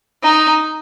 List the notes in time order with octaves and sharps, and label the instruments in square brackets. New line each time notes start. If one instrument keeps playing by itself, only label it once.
[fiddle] D#4